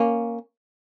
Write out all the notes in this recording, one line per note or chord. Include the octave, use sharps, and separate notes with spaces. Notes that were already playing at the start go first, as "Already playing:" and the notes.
Already playing: A#3 C#4